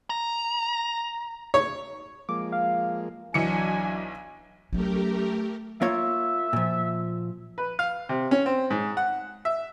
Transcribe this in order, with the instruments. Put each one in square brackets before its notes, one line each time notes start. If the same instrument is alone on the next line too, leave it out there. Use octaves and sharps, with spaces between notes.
[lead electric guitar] A#5
[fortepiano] C#5
[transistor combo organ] F3 G#3 A#3 [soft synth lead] D6
[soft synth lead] F5
[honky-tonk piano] B1 E3 C#7 [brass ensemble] F#3 D4 G#5
[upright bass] F#3 C#4 [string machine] A3 G4 A#4
[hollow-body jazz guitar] A#3 F4 C#5 [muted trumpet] E5
[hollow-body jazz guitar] A#2 F3
[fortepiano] B4
F5
C3
C#4
C4
G#2
F#5
E5